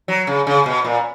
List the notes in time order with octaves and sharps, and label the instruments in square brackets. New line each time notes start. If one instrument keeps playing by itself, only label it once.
[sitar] F#3
C#3
C#3
B2
A#2